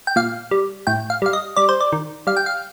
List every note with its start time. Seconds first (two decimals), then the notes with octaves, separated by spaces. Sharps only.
0.07 G5
0.16 A#2 F5
0.51 G3
0.87 A2 G5
1.10 F5
1.22 G3 F5
1.33 D#5
1.56 G3 D5
1.69 C5
1.81 D5
1.92 D#3
2.27 G3 F5
2.37 G5
2.46 F5